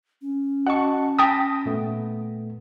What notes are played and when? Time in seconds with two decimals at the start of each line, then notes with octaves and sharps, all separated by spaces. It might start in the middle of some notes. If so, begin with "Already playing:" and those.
0.22 C#4
0.67 F#4 D#5 F#5 A5 C#6
1.19 G5 A5 B5 D#6 A#6 B6
1.66 A#2 A3 B3